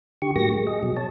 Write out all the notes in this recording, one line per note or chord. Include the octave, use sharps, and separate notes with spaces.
D3 G4 C#6
A2 F#3 A#3 G4 C#6 A#6
G#3
G#4 D#5
B2 F#3
C#5 A5